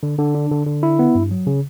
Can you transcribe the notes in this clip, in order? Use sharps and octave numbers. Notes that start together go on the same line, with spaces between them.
D3
D3
D4
D3
D3
E4
B3
G2
F#3
C#3